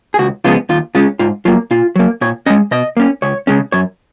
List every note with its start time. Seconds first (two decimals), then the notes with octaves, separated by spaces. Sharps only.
0.14 G#4
0.19 C#2 F#4
0.44 C#3 F3 G#3 B3 F4
0.69 D#2 F4
0.95 C#3 G#3 C#4 F4
1.19 G#2 F4
1.45 F#3 A#3 F4
1.71 A#2 F4
1.96 F#3 A#3
2.21 A#2 C#5
2.46 C#4 D#5
2.50 G#3
2.71 B2 D#5
2.97 A#3 C#4
3.22 C#2 C#5
3.47 C#3 G#3 C#4
3.72 F#2 C#5